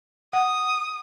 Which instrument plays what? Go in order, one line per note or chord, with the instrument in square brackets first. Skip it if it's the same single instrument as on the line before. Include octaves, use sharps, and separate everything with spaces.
[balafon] F#5 [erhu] D#6